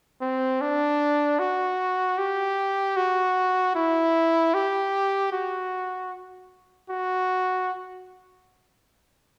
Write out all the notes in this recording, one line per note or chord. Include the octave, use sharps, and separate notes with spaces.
C4
D4
F#4
G4
F#4
E4
G4
F#4
F#4